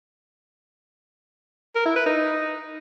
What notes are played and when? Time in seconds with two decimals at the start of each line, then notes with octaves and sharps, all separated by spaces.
1.75 A#4
1.85 E4
1.96 B4
2.06 D#4